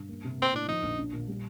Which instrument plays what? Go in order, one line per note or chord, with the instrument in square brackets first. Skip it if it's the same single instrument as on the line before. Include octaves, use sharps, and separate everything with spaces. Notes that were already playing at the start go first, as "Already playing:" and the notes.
Already playing: [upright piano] G2
A#3
C3
[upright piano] A#3 [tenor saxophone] C4
[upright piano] A2 [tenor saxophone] D4
[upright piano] F3 [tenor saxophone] D#4
[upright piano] A#1
D4
A#2
G3